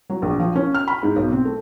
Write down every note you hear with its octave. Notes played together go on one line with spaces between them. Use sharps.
F#3
A#1
F3
C#4
F6
B5
G#2
B1
C4
A3